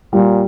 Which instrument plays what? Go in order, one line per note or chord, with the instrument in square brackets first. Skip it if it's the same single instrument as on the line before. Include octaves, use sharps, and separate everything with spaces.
[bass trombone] A#2 [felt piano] G3